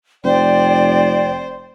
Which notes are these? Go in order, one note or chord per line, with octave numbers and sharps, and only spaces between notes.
F1 C5 D5 G5